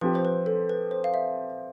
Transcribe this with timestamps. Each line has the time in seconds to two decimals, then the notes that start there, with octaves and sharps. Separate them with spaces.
0.01 F3 C4 G4 B4
0.15 C5
0.25 B4
0.46 A4
0.69 B4
0.91 C5
1.04 F5
1.14 E5